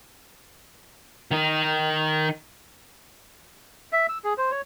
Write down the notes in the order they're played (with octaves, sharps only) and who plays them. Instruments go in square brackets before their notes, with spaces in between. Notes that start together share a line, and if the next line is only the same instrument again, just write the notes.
[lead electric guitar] D#3 D#4
[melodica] E5
E6
G#4
C5
C#5